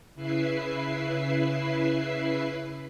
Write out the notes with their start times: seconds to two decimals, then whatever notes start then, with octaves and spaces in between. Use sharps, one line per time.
0.15 C#3 E4 B4 E5 C7